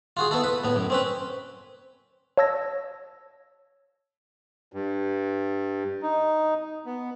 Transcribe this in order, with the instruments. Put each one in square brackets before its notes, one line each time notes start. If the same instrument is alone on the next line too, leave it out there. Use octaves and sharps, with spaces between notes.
[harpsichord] F4 F#4 G#4
B3 E4 A4
B4
A2 B3
F#2
C4 C#4 B4
[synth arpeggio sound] C#5 F5 A5 E6 G#6 A#6
[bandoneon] G2
D#4
B3